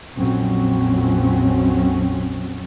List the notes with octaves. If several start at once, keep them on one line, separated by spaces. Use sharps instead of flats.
A#1 F2 F#3 C4 C#4